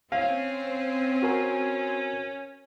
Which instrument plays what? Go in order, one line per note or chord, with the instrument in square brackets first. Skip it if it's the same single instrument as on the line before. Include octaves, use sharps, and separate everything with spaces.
[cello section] C4 [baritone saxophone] C#4 [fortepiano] F5
[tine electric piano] F#4 A#4 G#5